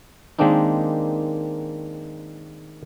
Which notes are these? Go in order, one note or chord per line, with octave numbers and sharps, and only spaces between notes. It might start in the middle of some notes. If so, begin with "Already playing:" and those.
D#3 G#3 A#3 C4 D4 D#4